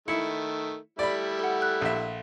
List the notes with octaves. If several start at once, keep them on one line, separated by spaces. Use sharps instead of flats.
D#3 A3 E4 C#7
G3 A3 E4 D5 B5
A4 F#5
F#6
A#1 E5